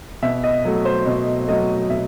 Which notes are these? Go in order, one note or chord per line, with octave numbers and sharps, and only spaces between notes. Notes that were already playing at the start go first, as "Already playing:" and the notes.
B2 E5
D#5
F#3 A3
C5
B2 C5
F#3 A3 D#5
B2 E5